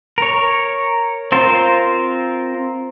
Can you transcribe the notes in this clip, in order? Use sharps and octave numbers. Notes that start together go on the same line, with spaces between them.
A#4 C#5
C4 F4 A#4 C5